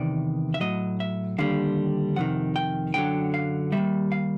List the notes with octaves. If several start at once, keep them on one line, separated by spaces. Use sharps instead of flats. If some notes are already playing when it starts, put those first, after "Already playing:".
Already playing: E2 C3 D#3 D5
E5
A2 F#3 D#5
E5
D#2 D3 G3 F5
F2 C3 D#3 F#5
G5
F#2 D3 F#3 G5
F5
D#2 D#3 G3 E5
F5